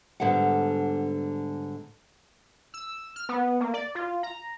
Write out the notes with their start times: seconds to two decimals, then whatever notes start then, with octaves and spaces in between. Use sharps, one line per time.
0.20 G#2 D3 G3 B3 F#5
2.74 E6
3.16 F6
3.29 B3
3.60 A#3
3.74 D5
3.95 F4
4.23 A#5